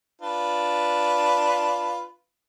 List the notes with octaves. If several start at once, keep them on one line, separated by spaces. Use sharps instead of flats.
D4 F4 B4